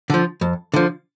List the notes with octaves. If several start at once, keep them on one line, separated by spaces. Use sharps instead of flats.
D3 F3
F2
D3 F3